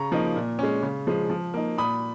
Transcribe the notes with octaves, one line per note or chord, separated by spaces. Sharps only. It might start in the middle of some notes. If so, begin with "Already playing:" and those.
Already playing: C#3 A#5 C#6
F3 A#3 D#4
A#2
G#3 C#4
C#3
F3 G#3
F3
A#3 D#4
A#2 B5 D#6